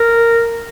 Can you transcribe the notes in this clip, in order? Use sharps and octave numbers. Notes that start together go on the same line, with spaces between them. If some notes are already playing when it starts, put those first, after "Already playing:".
Already playing: A#4